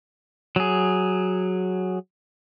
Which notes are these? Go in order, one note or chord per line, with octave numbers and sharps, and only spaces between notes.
F#3 G#4